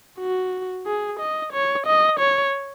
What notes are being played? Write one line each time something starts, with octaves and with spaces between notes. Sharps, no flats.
F#4
G#4
D#5
C#5
D#5
C#5